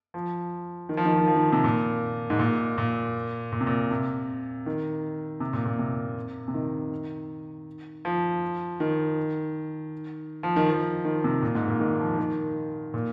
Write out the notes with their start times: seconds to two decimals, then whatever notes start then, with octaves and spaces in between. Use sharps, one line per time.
0.14 F3
0.89 D#3
0.97 F3
1.05 D#3
1.13 F3
1.21 D#3
1.28 F3
1.36 D#3
1.52 C3
1.64 A#2
2.30 G#2
2.39 A#2
2.78 A#2
3.52 A#2
3.61 C3
3.67 A#2
3.91 C3
4.66 D#3
5.40 C3
5.53 A#2
5.65 A#2
5.79 C3
6.48 C3
6.54 D#3
8.05 F3
8.80 D#3
10.43 F3
10.56 D#3
10.70 F3
11.05 D#3
11.24 C3
11.42 A#2
11.55 G#2
11.68 A#2
11.80 D#3
12.00 F3
12.18 D#3
12.94 A#2